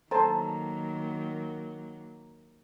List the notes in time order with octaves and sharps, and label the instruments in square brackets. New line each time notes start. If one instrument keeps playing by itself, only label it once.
[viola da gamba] D#3 F#3 A#3 [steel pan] A4 C5 A5 [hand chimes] A#5